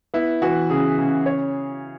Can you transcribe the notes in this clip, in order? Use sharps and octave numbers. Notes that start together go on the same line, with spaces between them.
B3 E4
E3 F#4
C#3 G#4
C#3
C#5